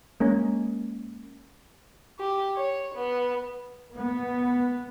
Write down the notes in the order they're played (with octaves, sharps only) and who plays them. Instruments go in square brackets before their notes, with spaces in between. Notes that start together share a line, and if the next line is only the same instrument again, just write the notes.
[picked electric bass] G#3 A#3 C#4
[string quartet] G4
C#5
B3
[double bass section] B3